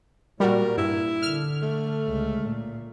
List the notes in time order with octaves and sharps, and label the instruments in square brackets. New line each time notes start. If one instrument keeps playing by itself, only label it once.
[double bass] A#2 [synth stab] G3 F#4 [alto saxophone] A#4
[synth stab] G2 [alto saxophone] E4
[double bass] D3 [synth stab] F6
[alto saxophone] A3
[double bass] C#2
A#2